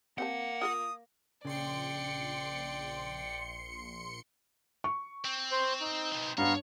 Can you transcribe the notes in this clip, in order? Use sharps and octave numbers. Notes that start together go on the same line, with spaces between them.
A#3 C4 G4 F#5 A5
F4 A4 A#4 D#6
A#1 C#3 D5 G5 C6 C#7
C#6
C4
C5
D#4
B2 C4
G2 B3 D4 C#5 F5 A#5